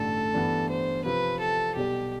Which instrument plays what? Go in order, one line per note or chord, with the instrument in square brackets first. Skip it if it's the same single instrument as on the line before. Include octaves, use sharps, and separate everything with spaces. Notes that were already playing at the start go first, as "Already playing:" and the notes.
Already playing: [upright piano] A1 G2 D3 A3 [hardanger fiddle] A4
[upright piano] G2 E3 B3
[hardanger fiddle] C5
[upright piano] C3 F3 C4 [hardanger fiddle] B4
[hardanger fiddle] A4
[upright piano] B1 B2 G3 [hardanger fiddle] G4